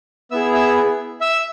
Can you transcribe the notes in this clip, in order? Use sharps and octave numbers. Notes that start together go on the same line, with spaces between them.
B3 E4 G#4 E5 E6
E5 E6
E5 E6